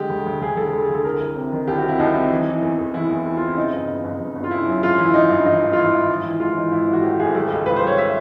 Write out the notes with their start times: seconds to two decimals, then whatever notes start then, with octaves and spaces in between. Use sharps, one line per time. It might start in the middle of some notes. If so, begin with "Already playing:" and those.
Already playing: D3 G#3 G4
0.09 D2
0.26 D2
0.41 D2 G#4
0.57 D3 A4
0.72 D2
0.84 G#4
0.89 D3
0.94 A4
1.04 C2 A#4
1.20 C2
1.36 C3
1.52 D#3
1.67 C2 G4
1.78 F#4
1.83 C3
1.88 E4
1.99 C2 D#4
2.15 C3
2.30 E3
2.46 E3
2.62 E2
2.78 E2
2.94 E2 E4
3.09 E2
3.25 E2
3.37 C3 F4
3.47 E4
3.56 C#3 D#4
3.72 G1
3.88 G1
4.04 G1
4.20 G1
4.36 G1
4.44 F4
4.51 C#3 E4
4.67 F#2
4.83 G#1 F4
4.98 E3 E4
5.14 E3 D#4
5.30 G2
5.45 E3 D#4
5.62 G#1
5.73 F4
5.77 E3 E4
5.93 G#1
6.08 G#1
6.24 E3
6.40 G#2 F4
6.57 E3 D#4
6.72 G#1 E4
6.88 E3
6.93 F#4
7.03 A3 G4
7.19 G#1 G#4
7.34 G3 A4
7.51 C#2
7.66 C#2 B4
7.76 C5
7.82 G3 C#5
7.98 E5